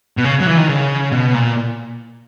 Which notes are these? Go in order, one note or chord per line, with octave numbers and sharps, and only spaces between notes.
B2
C#3
F#3
E3
D#3
C#3
B2
A#2